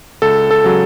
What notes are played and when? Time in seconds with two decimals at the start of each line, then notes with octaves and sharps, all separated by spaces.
0.22 C#2 A4
0.51 A4
0.64 C#3 F#3